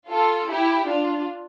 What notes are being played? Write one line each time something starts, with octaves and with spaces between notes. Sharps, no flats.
F4 A4
E4 G4
D4 F4